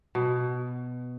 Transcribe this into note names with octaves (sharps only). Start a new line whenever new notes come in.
B2